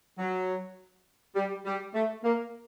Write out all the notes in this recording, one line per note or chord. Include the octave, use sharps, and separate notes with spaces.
F#3
G3
G3
A3
A#3